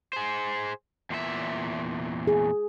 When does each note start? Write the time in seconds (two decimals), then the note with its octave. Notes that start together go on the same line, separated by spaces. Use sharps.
0.13 G#4 C5
1.10 E2 A#2 E5
2.27 G#4